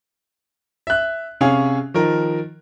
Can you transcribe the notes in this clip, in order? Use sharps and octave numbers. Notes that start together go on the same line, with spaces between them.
E5 F#6
C3 C#4 G#4 F5
D#3 F3 A#4